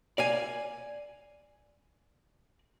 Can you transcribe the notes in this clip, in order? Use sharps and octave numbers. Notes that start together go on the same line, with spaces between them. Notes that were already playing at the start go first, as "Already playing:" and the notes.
D5 F5 G#5